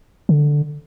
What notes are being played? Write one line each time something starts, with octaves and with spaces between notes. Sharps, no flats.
D3